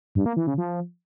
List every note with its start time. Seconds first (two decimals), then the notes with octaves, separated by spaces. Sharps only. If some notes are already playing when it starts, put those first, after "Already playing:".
0.15 G2
0.26 A#3
0.37 E3
0.47 C#3
0.58 F3